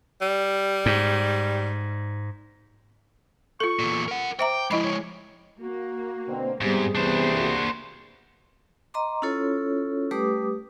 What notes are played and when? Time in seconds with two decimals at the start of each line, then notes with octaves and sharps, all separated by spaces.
0.22 G3
0.86 G#2
3.60 F4 A4 C#6
3.79 E2 A#2
4.08 A#4 F#5
4.39 C5 E5 G5 A#5 D6
4.71 F3 G#3 E4 D#5 B5
4.84 C#5
5.60 A#3 F#4
6.28 B2 D3 C4
6.61 G#2 C3 G3 B3 G#4
6.95 C3 E3 B3 D4 C5
7.34 A#3 F#4
8.94 D#5 A#5 C6 D6
9.22 C#4 E4 F4 A4 C#5
10.11 G3 A3 G4 B4 D6 D#6